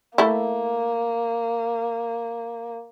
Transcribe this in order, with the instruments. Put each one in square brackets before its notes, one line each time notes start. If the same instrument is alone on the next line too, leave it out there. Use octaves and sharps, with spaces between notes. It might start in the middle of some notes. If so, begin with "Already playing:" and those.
[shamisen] A3 E4 [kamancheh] A#3